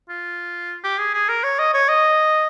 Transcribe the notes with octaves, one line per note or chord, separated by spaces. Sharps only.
F4
G4
G#4
G#4
A#4
C#5
D#5
C#5
D#5